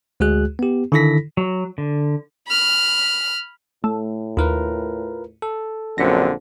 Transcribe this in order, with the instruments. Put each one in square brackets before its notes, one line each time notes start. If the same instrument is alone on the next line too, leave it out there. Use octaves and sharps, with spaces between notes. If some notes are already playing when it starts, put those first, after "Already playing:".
[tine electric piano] D2 G#3 F#4 G#4 F#6
B3 G4
D3 D#3 E4 A4 A#6 B6
[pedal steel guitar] F#3
D3
[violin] B5 F6
[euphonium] A2 [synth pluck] A3
[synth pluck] D#2 [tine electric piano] F4 A#4 B4
[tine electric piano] A4
[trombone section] A#1 D3 C4 [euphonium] F#2 [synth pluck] A#6 B6 C#7